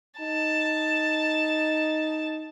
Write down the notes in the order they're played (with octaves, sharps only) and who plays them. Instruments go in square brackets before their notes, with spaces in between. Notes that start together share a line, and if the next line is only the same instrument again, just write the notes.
[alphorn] D#4 [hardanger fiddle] A5